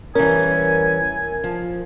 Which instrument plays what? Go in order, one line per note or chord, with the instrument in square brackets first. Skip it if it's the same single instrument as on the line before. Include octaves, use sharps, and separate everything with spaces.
[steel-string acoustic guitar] E3 G3 C#4 [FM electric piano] A#4 [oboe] G#5
[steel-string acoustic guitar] F3